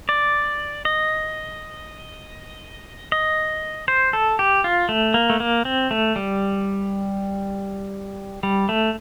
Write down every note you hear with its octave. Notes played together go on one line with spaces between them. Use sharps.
D5
D#5
D#5
C5
A4
G4
F4
A3
A#3
A3
A#3
C4
A3
G3
G3
A3